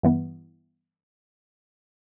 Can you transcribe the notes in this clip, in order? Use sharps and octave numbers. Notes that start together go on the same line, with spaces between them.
G2 E3 B3